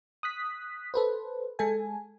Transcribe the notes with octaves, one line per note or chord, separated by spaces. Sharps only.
D#6 F#6 B6
A4 B4 C5
G#3 A4 G#5